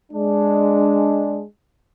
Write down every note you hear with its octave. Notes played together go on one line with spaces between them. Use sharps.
G#3 D4